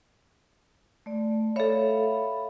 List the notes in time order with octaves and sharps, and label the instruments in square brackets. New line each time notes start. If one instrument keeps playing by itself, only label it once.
[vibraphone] A3 D5
[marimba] A4 C#5 [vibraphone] E5 F5 B5